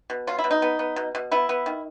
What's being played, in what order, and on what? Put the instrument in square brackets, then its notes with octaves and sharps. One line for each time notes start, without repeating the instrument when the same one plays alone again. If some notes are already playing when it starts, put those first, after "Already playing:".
[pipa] B2
F#3 F4
E4
B2
D#4
B3
B3
B2
B2
B3 E4
B3
D#3